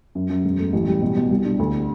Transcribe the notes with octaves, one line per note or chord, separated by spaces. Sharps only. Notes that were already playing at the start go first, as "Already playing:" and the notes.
F#2
F#2
E1
A3
A1
G3
B2
B2
C2
D4
D2